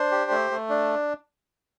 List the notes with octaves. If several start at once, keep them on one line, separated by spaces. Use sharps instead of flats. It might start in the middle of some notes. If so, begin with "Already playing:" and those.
Already playing: D4 C5
G4
A3
A3
D4